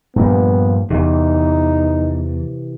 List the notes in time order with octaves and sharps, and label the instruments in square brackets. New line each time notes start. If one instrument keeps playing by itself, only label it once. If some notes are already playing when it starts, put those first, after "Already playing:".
[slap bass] G2 A#2 F3 [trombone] B3
[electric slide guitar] E2 [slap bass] C3 E3 [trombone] D#4